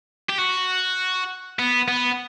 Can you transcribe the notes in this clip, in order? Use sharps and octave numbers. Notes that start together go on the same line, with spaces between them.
G4
F#4
B3
B3